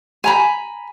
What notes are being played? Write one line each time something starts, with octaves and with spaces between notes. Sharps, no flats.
G#5 A#5 B5